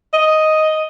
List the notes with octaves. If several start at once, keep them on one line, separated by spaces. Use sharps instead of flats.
D#5